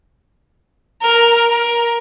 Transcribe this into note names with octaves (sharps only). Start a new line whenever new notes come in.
A#4 F6
A#4